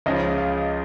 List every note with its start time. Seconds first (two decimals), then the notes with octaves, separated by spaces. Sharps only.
0.06 C#2 C#3 F3 D#5
0.38 F5